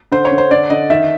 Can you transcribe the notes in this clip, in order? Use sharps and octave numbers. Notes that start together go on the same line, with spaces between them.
D3 C5
C#5
D3
C5
D3 D5
D3 D#5
D#3 E5